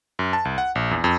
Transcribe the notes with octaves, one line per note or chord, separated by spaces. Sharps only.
F#2
A5
C2
F#5
A#1
E2
F2